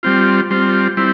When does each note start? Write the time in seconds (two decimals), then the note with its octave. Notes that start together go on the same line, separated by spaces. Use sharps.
0.03 G3 C4 F4
0.50 G3 C4 F4
0.97 G3 C4 E4